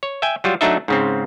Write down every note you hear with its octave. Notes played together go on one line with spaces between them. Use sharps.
C#5
E5 G5 G#5
F#3 G3 F4
F#3 A3 D4 D#4 E5
G#2 C#3 C4